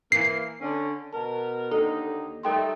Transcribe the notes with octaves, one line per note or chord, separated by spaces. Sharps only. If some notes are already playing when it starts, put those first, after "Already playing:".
E3 A#3 C7
D3 C#4
B2 A#4 A5
D#2 D3 D#4 A4
G3 A3 D#4 A#4 G5 C6